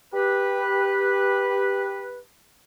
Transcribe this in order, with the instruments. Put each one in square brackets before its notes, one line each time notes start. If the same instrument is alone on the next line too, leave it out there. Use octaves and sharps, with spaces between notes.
[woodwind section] G4 B4